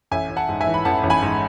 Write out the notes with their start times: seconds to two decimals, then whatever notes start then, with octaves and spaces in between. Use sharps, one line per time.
0.11 A1 E5 G#5
0.30 A1
0.36 F#5 A5
0.49 G#2
0.61 E5 G#5
0.67 E3
0.74 B5
0.85 A1 F#5 A5
1.03 A1
1.10 G#5 B5
1.22 G#2